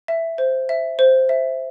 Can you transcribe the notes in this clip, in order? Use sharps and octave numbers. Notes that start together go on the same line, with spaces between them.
E5
C5
E5
C5
E5